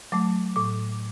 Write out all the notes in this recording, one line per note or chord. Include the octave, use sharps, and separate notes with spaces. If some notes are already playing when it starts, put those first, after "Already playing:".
F#3 A3 D6
A2 D6